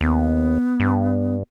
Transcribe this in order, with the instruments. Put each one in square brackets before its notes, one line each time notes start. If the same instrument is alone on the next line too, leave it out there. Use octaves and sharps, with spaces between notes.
[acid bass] D#2 [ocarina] B3
[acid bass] G2